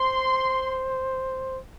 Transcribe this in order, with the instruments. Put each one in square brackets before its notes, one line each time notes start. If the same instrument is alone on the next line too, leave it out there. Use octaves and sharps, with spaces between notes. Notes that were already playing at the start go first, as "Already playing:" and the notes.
Already playing: [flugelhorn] C5 [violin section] C6